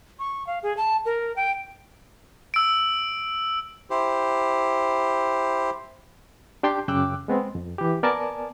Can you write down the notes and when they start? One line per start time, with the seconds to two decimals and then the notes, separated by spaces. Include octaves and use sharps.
0.19 C#6
0.47 F5
0.63 G#4
0.77 A5
1.06 A#4
1.36 G5
2.54 E6 D7
3.90 E4 G4 C5
6.63 D4 G4 G5 A5 C6 G6
6.88 F#2 C#3 G5 D6 E6 F#6
7.28 G#3 B3 C4
7.55 F2
7.78 E3 G4
8.03 B3 A#4 D5 G#5 A5